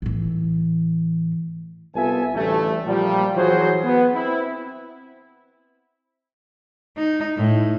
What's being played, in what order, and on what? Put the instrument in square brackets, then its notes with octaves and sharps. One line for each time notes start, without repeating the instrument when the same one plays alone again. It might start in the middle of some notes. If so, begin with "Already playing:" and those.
[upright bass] A2 E3
[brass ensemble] C2 B3 F4 A4 E5 G#5
A1 D2 G3 A3
A#2 F3 G3
E3 F#3 F4 F#4 G#4 C5
B3
C4 E4
[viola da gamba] D#4
A2